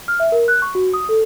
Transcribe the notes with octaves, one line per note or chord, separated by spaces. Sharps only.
F6
E5
A#4
F#6
C#6
F#4
D#6
A4